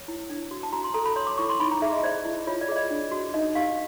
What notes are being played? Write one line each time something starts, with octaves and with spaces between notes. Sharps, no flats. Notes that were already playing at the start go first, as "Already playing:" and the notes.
Already playing: C#5
E4
D4
F#4
A5
F#4 A#5
C6
A4 A#5
B5
C#5 C6
D6
E4 C#6
C6
D#4 B5
A#5
G#4 E5
D#5
C5 D5
E4
F4 C#5
D5
G#4 D#5
D5
D4
F#4
D#4 D#5
G4 F5